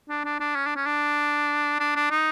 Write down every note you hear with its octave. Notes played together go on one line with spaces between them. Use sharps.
D4
D4
D4
C#4
D4
C#4
D4
D4
D4
D#4